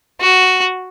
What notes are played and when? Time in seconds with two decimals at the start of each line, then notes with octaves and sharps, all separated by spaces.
0.21 F#4